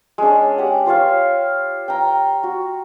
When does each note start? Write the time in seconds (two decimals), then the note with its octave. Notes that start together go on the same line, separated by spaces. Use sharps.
0.18 G#3 C#4 D4
0.58 G4 F#5
0.86 F4 C5 C#5 F5
1.88 G5 A#5
2.43 F#4